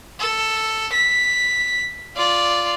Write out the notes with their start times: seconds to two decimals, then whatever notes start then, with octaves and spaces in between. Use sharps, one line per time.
0.20 A4
0.93 B6
2.16 F4 D5